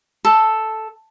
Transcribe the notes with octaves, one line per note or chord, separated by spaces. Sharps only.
A4